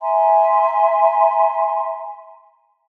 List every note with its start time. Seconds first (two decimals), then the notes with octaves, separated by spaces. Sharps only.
0.01 E5 G#5 A#5 C6